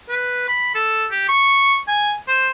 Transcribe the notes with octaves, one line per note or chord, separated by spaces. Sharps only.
B4
B5
A4
G4
C#6
G#5
C5